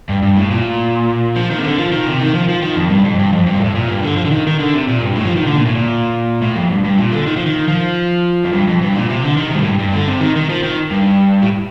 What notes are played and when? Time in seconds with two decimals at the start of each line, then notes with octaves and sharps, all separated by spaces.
0.09 G2
0.23 G2
0.37 A2
0.51 A#2
1.36 F3
1.50 D#3
1.59 C3
1.64 D3
1.78 F3
1.92 D#3
2.07 C3
2.20 D#3
2.34 F3
2.49 F3
2.62 D#3
2.76 F2
2.90 G2
3.04 F2
3.19 G2
3.33 F2
3.47 G2
3.55 A#2
3.60 A2
3.75 A#2
3.89 G2
4.03 D3
4.17 F3
4.25 D3
4.31 D#3
4.47 D#3
4.59 D3
4.74 C3
4.87 A#2
5.01 G2
5.16 A2
5.25 F3
5.36 D#3
5.47 D3
5.57 A#2
5.66 A2
5.75 A#2
6.42 A2
6.56 F2
6.70 G2
6.84 G2
6.98 A#2
7.12 D3
7.26 D#3
7.36 F3
7.46 D#3
7.68 F3
8.44 F2
8.52 G2
8.67 F2
8.81 G2
8.95 A#2
9.09 C3
9.23 D3
9.37 D#3
9.48 C3
9.54 G2
9.58 A2
9.69 G2
9.79 G2
9.93 D3
10.08 C3
10.21 D#3
10.36 D#3
10.49 F3
10.63 D#3
10.91 G2
11.42 A2